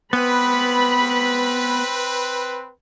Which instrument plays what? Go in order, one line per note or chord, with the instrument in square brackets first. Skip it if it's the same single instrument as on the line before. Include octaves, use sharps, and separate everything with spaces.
[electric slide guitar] B3 [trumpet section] C4 B4 [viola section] B5